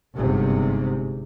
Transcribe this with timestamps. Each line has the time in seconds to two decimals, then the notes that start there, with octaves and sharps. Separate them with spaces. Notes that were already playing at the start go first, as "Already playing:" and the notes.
0.15 G1 G#2 C3